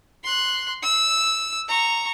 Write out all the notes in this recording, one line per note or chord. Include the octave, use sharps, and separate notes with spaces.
C6 F#6
E6
A#5 C#6